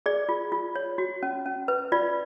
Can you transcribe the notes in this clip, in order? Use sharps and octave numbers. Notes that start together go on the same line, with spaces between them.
G#4 D5
F4
F4
C#5
F#4
C#4
C#4
B4
F4 D5